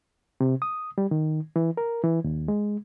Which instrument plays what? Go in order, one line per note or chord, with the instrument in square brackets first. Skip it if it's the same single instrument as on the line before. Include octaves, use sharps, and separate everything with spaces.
[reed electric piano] C3
D#6
G3
D#3
E3
A#4
E3
D#2
G#3